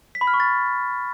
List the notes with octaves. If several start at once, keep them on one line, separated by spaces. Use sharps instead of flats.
B6
B5
F6
C#6
A6